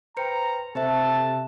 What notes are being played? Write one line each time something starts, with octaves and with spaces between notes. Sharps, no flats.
B4 C5 G5 A#5 C#7
C3 G4 A4 C5 E5 A5